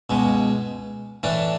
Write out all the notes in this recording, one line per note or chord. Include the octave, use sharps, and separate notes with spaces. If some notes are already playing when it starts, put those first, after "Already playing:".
C#2 B2 G#3
A2 E3 A3 D4